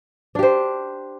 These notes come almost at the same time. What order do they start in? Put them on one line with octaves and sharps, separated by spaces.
D4 G4 C5